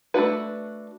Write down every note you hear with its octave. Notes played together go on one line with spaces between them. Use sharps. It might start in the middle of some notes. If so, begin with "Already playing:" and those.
A3 D4 F#4 B4